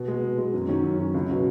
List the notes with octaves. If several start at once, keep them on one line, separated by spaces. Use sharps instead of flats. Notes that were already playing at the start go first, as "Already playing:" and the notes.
Already playing: B2
G#3 B3
B2
G#3 B3
F#2
D#3 F#3 C#4
F#2
D#3 F#3 C#4
C#2
B2 F#3 C#4 F#4